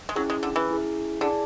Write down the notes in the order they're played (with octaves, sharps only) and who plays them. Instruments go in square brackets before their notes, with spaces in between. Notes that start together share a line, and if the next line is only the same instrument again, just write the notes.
[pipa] G#3
[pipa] F#3 [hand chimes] C#4 E4 G#4
[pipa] G#3
D3
E3
[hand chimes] C#4 E4 G#4
[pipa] D3 [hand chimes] E4 G#4 D5 A5